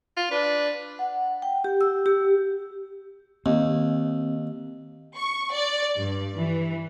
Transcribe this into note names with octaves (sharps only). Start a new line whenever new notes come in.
F4
D4 B4
F#5
G5
G4
E6
G4
D#2 C4
C#6
D5
G2
E3